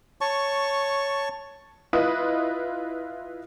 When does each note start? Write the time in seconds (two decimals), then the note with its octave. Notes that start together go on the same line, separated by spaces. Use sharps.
0.21 C#5 A5 C#6
1.93 E4 F4 B4 D#5 D#6